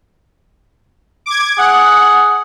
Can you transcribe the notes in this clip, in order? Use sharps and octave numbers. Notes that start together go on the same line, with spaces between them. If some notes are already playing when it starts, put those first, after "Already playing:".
D6 G#6
G#4 F#5